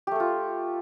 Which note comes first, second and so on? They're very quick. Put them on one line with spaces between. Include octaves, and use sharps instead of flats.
G4 A3 A4 F4